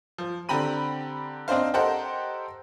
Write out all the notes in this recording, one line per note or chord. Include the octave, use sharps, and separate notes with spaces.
F3
D3 C4 G4 A#5 B5 D#7
C4 D4 D#4 C5 F5
G4 A4 A#4 C5 D#5 F#5